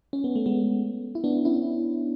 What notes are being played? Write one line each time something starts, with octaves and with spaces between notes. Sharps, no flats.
C#4
B3
A3
G#3 B3
E4
B3 D4
C#4 E4